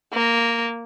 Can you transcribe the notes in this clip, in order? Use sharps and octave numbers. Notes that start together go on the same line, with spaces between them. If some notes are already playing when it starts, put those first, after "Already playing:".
A#3